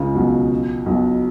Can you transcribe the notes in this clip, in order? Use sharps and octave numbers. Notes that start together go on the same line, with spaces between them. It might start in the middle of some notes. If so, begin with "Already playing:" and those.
Already playing: C#2 C#3
B1 B2
B1 B2